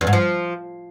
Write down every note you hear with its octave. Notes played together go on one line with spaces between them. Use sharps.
E2
G#2
F3